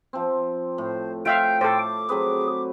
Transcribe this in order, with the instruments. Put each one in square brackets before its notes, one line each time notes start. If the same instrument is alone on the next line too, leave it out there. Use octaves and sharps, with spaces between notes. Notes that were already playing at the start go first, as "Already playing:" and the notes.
[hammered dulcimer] F3 C4
[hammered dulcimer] A2 [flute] C5
[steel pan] F4 E5 F5 [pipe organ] G5 [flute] G6
[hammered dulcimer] A2 [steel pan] A4 C5 [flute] D6
[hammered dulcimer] F#3 C4 B4 [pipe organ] G#4